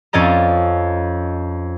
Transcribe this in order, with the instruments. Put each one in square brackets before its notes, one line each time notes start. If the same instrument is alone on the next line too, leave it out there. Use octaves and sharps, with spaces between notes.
[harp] F2 C#4 D5 D#5 A#5